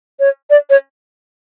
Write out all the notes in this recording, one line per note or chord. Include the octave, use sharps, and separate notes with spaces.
C#5
D5
C#5